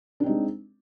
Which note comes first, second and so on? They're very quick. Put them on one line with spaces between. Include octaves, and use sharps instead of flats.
D4 C4 D#4 G#3